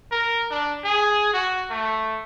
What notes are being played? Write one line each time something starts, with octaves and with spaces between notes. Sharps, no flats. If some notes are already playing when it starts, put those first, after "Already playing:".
A#4
D4
G#4
F#4
A3